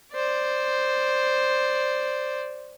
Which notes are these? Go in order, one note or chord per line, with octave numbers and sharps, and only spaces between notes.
C5 D5